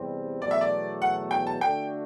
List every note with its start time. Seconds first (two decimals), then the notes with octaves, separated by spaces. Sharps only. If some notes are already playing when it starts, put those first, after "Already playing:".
Already playing: E2 C3 G3 C4
0.42 E2 B2 F#3 A3 D5
0.51 E5
0.61 D5
1.02 F#5
1.31 G5
1.47 A5
1.61 D3 A3 D4 F#4 G5